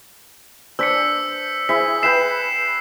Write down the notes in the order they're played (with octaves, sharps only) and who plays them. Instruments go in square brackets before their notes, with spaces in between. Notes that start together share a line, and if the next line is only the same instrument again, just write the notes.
[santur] D4 C5 D5 [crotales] E6 B6 C#7
[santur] E4 G#4 C5 [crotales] B6
[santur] B4 G5 B5 [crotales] C7 E7